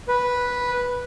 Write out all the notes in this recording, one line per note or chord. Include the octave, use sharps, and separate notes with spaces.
B4